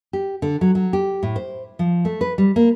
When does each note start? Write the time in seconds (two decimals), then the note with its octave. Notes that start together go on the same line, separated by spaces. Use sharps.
0.13 G4
0.42 D3
0.61 F#3
0.75 F#3
0.93 G4
1.23 A2
1.36 C5
1.79 F3
2.05 A3
2.21 B4
2.38 G3
2.56 A#3